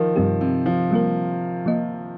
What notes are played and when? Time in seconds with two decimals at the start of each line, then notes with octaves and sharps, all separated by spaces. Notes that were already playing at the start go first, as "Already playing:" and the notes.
Already playing: D#3 F3
0.16 G2 C3 G3 C4 G4
0.41 C3
0.66 F3
0.91 G3 A#3 F4 A#4
1.66 F3 A#3 F4 D#5